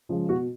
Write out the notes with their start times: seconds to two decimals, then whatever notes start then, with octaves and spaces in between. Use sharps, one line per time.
0.09 C#3 F3 G#3
0.29 B2 F#4